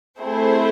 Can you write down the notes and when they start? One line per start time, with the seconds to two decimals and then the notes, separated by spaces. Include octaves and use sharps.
0.20 A3 C4 E4 G#4 C5